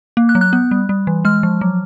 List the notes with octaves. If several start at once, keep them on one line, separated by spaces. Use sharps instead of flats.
A#3
F#6
F#3
F#6
B3
G3
G3
E3
G#3 F6
F3
F#3